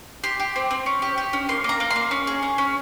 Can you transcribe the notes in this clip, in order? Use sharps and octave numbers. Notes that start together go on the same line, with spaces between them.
G4 C6
G4
C4
C4
C#4
G4
G4
C#4
A#3 C6
A#3 A#5
A#3
C6
A#3
C#4
G#4
C#4
C#4